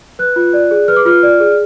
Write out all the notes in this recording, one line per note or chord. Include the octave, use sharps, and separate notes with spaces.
B4 F#6
F4
D5
G#4
B4 F6
D6
F4 F6
D5
G#4